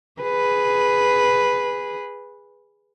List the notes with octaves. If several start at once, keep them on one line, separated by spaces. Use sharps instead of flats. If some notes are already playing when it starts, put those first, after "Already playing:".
G#4 B4